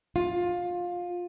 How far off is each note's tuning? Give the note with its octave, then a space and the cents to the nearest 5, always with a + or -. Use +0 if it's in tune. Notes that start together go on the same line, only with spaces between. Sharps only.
F4 +20